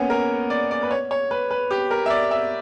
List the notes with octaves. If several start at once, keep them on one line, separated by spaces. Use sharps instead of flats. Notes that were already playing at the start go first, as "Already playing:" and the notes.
Already playing: A#3 B3 C#4
A#4
D5
D5
B4
C#5
C#5
B4
B4
G4
A#4
E5
D5
E5